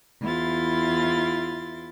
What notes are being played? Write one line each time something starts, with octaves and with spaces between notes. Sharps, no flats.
E2 E4 F4 C6 A6